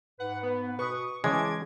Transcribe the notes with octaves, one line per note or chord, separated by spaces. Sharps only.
G#2 B4 F#5
B3
B2 B4 C#6 D#6
C#3 E3 G#3 C#4 C#5 A5 D6 G#6